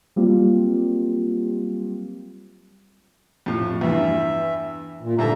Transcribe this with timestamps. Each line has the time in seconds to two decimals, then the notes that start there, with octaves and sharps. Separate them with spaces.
0.16 F#3 G3 A#3 C4 F4 G4
3.46 F2 A2
3.81 E2 G2 E3 E5
5.01 A#2
5.19 G#2 D3 G3 E5 A5 A#5